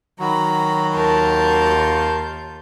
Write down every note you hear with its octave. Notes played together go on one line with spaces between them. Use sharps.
D#3 F#3 F#4 A#5 B5
D#2 F4 A#4 A5 G6